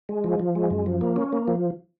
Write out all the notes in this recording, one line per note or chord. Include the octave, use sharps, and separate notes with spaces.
G#3
F3
F3
G#3
F#2
F3
A#3
C#4
A#3
F3